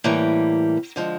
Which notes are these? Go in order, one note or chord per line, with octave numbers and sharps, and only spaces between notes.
A2 E3 G3 A#3
D3 F3 G#3